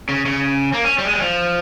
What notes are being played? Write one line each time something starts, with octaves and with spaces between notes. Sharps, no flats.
C#3
C#3
A#3
C#4
G3
G#3
G3
F3